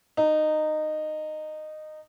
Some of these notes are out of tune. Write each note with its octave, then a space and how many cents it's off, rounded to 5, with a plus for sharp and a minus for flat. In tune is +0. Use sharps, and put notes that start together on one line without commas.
D#4 -15